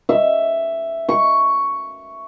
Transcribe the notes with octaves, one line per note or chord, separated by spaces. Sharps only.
E5
C#6